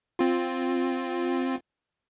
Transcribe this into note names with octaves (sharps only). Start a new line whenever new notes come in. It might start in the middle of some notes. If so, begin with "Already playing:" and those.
C4 F4